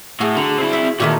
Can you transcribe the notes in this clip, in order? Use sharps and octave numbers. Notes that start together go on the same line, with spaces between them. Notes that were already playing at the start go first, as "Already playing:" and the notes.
A2 F#4 G#4
D3 A#5
C4 E4
E5
A#2 D#3 A3 F#4 E5